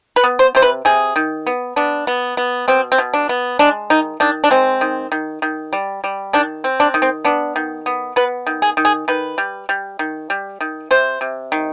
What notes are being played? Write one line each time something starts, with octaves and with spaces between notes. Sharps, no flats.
B4
B3
C5
C3 C5
B4
C3 G#4
D#3
B3
B3 D4
B3
B3
B2 C4
C4
B2
D4
B3
G#3 D4
D#3 D#4
D#3 D4
D4
G#3 C4
D#3
D#3
D#3
G3
G3
D#3 D4
C4
D4
D#3
C4
B3 D4
D#3
B3
B3 B4
D#3
G#4
D#3
G#4
D#3 B4
G3
G3
D#3
G3
D#3
C3 C5
C3
D#3